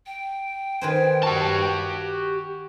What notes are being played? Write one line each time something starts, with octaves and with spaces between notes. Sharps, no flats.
G5
D#3 B4 C5 G#5
F#4 G4 A5